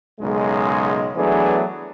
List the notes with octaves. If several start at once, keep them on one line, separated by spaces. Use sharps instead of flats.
B1 F#2 C#3 G#3
E3 F#3 A3 B3 D4 G#4